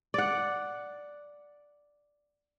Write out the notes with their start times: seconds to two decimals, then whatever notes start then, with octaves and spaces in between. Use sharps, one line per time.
0.14 D5 F#5